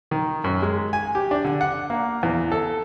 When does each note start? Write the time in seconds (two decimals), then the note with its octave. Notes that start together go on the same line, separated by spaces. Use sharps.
0.11 D#3
0.44 F#2
0.62 G#3
0.93 G#5
1.15 G4
1.31 D4
1.44 D3
1.61 F#5
1.90 A#3
2.23 E2
2.52 A4